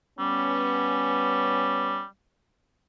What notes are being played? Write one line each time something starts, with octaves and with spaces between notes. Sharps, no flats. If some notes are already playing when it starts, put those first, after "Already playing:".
G3 B3 C#4